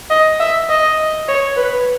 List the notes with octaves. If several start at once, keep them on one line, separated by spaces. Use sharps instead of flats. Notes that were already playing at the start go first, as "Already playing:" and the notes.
D#5
E5
D#5
C#5
B4